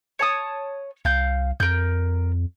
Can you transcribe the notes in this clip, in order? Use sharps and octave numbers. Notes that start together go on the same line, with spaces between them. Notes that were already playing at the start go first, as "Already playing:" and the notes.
C#5 A5 D#6
C2 F5 G6
F2 A#4 G6